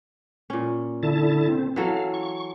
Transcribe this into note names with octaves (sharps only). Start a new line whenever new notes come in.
A#2 C#4
D3 E4 A5
C4
E3 F#3 A4 F5
C#6